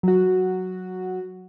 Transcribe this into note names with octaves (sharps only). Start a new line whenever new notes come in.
F#3 F#4